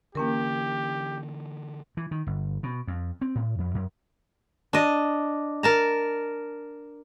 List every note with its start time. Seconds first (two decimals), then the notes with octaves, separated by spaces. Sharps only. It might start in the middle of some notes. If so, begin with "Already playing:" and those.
0.15 D3 E3 A#3 C#4 G4 A#4
1.97 E3
2.11 D#3
2.27 G1
2.63 B2
2.87 F2
3.21 C4
3.35 A2
3.59 F2
3.75 F#2
4.73 D4 D#5
5.63 A#4 A5 A#5